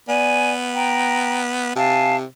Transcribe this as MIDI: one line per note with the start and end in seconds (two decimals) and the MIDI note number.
0.09 1.74 59
0.09 0.54 74
0.09 0.54 80
0.75 1.41 79
0.75 1.41 82
1.75 2.25 48
1.75 2.16 77
1.75 2.16 80
1.75 2.16 81